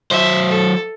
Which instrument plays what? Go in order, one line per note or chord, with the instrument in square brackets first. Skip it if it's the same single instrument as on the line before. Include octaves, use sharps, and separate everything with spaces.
[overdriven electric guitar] F#3 C5 [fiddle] E5
[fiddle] A4